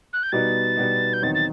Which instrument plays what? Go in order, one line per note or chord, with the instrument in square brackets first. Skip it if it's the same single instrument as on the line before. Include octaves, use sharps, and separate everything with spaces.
[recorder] F#6
G6
[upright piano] B2 G3 B3 D#4 [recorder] A6
[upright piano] B2 G3 B3 D#4
[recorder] G6
[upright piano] E2 D#3 F#3 C4 D#4 [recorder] A6
[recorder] A6